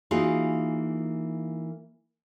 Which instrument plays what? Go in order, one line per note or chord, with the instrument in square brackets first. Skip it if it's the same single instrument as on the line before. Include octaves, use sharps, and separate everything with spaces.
[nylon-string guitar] E3 A#3 D#4 F4 F#4 G#4